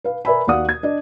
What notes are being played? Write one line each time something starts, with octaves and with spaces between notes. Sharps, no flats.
B4 F5
A#4 B4 D5 E5 G#5 B5
D#2 F#4 D5 F5 F#5 D#6
G#6
D4 D#5